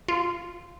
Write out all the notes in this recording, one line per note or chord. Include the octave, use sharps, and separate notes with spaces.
F4